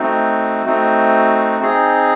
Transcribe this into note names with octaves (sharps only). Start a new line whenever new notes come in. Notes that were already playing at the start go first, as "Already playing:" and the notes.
Already playing: A3 C4 D#4 F#4
A3 C4 D#4 F#4
C4 D#4 G#4